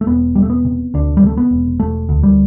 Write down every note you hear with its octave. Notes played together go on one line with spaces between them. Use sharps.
A3
E1 B3
E1 G3
A3
B3
C3
D2 D4
G3
C3 A3
B3
E1
E1 A3
D2
G3